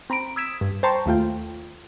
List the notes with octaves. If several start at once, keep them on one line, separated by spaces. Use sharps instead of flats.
C4 A#5 B5 D7
D#6 E6 G#6 B6 D7 E7
G2
C5 G5 A5 A#5 C6 C#6
D#2 A3 F4 G5